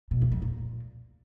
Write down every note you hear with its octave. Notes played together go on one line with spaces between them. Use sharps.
B2
E2
F2
A#2